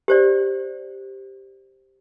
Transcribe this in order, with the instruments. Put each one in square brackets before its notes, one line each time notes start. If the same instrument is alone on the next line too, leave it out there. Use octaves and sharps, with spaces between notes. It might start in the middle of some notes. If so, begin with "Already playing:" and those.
[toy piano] G4 C5 D5